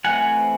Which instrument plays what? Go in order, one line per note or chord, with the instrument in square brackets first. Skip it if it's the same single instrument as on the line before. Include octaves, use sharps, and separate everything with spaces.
[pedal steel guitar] E3 A3 C4 F#5 G#5